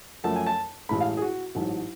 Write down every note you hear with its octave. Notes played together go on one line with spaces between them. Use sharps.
F#2 F3 A3 A5
G#5
A5
A1 A2 G#3 B5
F5
G#4
F#4
A1 G#2 F#3